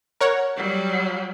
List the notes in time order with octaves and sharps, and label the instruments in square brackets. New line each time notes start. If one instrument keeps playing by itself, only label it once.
[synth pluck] A#4 C#5 F#5
[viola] F#3 G3